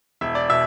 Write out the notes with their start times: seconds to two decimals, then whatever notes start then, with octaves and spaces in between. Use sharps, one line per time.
0.21 E1 E5
0.35 D5
0.50 B2 E5